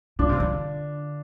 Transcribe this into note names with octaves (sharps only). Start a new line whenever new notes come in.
D3 D4 F4
C3
D3